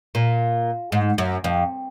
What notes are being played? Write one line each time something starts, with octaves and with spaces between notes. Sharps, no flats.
A#2
G#2
F#2
F2